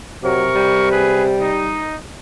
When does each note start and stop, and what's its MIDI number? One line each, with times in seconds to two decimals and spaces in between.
0.24 1.50 48
0.24 0.44 54
0.24 0.87 70
0.24 0.87 85
0.55 1.83 55
0.91 1.23 68
0.91 1.23 71
1.41 1.97 63